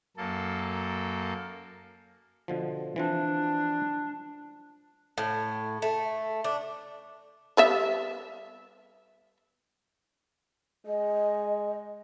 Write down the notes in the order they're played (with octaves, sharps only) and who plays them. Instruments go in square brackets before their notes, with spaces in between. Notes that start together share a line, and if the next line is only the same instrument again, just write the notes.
[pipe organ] F#2 A#3 A4
[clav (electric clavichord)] B2 D3 F3
[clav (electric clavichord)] E3 F3 C4 [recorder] D4
[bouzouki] A2
A3
D4
[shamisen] G3 B3 E5
[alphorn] G#3 [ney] D#5